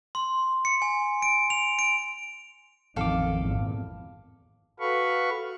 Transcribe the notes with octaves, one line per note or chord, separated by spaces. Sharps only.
C6
C#7
G#5
D7
F7
D7
A1 F2 D#3 A4 F5 D6
G#1 E2 A#2
F#4 A4 B4 F5 B5 C#6